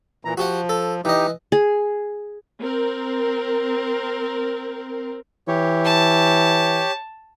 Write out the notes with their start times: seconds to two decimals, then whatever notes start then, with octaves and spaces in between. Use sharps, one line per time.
0.25 A#2 E3 A#5
0.37 F3 F#4 G4 F#5
0.69 A4
1.05 E3 D#4 G4 D#5
1.52 G#4
2.60 C4 A#4
5.48 E3 G4 C#5
5.85 A5